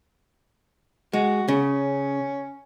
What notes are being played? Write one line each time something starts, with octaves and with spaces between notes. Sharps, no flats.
G#3 F#4
C#3 C#4